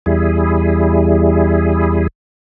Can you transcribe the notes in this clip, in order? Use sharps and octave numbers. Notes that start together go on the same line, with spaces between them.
E2 G3 E4 G#4